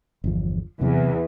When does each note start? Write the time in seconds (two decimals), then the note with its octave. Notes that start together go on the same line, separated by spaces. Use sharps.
0.24 G1 E2 F3
0.81 E2 C3 F#3 B3